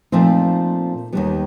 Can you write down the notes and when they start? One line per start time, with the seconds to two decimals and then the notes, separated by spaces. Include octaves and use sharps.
0.12 A#2 F3 A3 C4 D#4
1.13 D#2 D#3 G3 B3